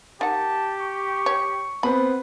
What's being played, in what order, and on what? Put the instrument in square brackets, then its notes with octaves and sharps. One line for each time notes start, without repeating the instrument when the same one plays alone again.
[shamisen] D#3 F#5 [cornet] G4 [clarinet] A5
[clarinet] C#6
[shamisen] C#5
[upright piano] B3 C4 [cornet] B4 [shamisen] B5